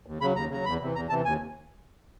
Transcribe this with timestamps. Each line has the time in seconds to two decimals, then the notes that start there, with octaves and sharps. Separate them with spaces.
0.06 D#2
0.20 C#3 F#3 B5
0.36 D#2 A#5
0.50 C#3 F#3 A#5
0.65 E2 B5
0.80 C3 E3
0.95 E2 A#5
1.09 C3 E3 A5
1.25 D#2 G#5